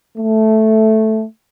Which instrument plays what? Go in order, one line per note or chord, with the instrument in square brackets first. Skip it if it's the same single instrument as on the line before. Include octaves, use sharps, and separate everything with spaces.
[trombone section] A3